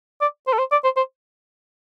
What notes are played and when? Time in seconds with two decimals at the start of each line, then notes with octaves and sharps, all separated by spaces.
0.22 D5
0.47 C5
0.53 A4
0.59 C5
0.72 D5
0.84 C5
0.97 C5